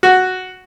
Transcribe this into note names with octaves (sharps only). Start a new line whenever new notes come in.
F#4